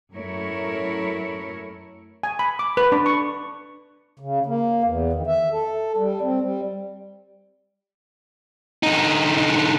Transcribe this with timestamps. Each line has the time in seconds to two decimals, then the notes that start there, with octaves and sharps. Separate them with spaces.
0.13 F#2 A3 E4 A#4 C#5
2.23 G#5
2.39 B5
2.59 D6
2.77 B4
2.92 D4
3.06 C#6
4.20 C#3
4.46 A#3
4.84 E2
5.13 D#3
5.27 E5
5.52 A4
5.97 G3
6.22 C4
6.41 G3
8.83 D3 D#4